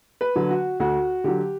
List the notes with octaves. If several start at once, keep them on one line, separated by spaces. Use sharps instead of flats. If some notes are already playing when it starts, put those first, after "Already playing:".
B4
D3 F#3
F#4
D2 F#4
D3 F#3 G4